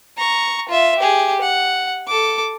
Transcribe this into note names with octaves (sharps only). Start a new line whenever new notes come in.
A#5 C#6
F4 E5
G4 G#4
F#5
A4 D6